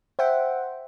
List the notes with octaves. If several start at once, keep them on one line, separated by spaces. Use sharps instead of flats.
C5 E5 F#5 G5